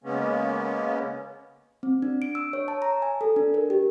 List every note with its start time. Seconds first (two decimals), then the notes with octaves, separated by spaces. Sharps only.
0.04 C#3 G#3 A#3 B3 C#4
1.83 C4
2.02 D4
2.22 D7
2.35 E6
2.53 C#5
2.68 A5
2.82 A#5
3.02 G#5
3.21 A4
3.36 D4
3.54 A#4
3.70 G4